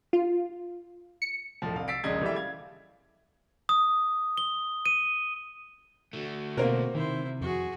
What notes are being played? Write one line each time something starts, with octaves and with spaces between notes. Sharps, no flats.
F4
C#7
E1 A2 F3
C2 F5
E6 A6 B6 C7 D7
D#1 A#1 C#3 G#3 D#5 G#6
E3 G3 G4 A4 D5 E5
F5 G#6
D#6
G7
D#7
D3 A3 F#4
B2 A#3 C4 A#4
C3 D#3 E4 C5
F2 F#4 G#4